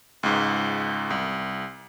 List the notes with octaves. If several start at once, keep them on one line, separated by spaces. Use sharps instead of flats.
C#2 G#2
C2